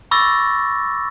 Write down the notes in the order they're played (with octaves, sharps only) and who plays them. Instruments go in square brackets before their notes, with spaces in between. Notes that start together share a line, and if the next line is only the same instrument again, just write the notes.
[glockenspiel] B5 C#6 D6 E6 A6 A#6